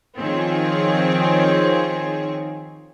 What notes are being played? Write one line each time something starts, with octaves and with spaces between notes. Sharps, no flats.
D#3 F3 C4 F4 G#4 C#5